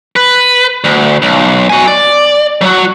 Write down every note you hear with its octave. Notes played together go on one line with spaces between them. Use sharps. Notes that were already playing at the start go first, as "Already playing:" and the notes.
B4
D2
B1
F#4 G#5
D5
F#3 F#4